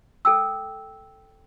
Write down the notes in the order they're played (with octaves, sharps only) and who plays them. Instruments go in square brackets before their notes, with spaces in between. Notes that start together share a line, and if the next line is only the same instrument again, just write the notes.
[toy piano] A4 G5 E6